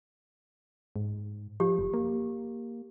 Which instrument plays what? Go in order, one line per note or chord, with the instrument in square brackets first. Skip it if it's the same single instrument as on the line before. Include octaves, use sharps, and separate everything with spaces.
[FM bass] G#2
[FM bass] F3 [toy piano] G4
[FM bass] F#1
A#3